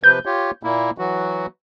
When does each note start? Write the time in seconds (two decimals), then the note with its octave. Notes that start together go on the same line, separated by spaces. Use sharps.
0.04 C3 F3 B4 G6
0.26 F4 G4 C#5
0.63 A#2 A#3 E4
0.98 E3 F#3 F#4